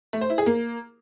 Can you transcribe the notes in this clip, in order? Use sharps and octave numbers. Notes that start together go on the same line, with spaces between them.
A3
C5
E4
G#4
A#3